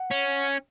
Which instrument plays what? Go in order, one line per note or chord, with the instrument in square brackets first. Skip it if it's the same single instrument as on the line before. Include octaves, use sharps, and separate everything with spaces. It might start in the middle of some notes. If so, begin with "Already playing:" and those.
Already playing: [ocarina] F#5
[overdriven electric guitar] C#4